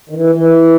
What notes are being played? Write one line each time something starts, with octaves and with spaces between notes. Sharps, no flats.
D#3
E3
E3